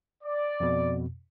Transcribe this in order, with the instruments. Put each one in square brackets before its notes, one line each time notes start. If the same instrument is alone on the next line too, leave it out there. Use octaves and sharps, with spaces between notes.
[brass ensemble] D5
[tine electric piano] F2 B2